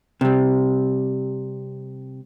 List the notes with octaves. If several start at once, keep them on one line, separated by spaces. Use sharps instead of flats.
C3 G3